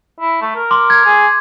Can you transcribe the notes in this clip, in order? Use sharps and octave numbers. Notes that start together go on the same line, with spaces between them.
E4
A3
A#4
C6 D6
G#6
G#4